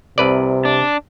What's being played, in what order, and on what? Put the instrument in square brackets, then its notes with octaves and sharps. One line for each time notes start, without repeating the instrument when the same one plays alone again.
[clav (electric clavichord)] C2 B4 D5 [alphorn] C3
[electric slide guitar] D4